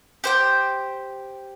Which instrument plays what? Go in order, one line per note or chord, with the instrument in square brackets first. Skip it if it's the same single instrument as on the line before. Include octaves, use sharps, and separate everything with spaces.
[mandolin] G4 C5 G5